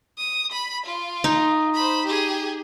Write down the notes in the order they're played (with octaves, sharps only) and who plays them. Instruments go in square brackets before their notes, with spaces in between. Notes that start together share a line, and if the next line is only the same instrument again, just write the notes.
[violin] D#6
B5
F4
[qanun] D#4
[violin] C5 B5
G4 G#4